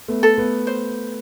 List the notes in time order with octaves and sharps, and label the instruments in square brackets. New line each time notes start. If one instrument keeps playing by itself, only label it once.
[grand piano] A3 B3
[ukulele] A4
[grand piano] A3 B3
[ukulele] C5